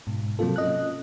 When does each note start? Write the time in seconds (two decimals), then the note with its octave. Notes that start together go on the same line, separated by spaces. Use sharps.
0.07 G#2 B2
0.39 C3 F#3 A#3 C4 F4 A4
0.56 C#4 D#5 F#6